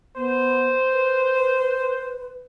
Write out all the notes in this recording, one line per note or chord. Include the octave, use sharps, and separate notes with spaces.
B3 C5
B4